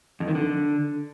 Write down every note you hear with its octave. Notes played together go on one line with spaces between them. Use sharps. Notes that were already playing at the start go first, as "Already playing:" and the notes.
F2
D#3
D3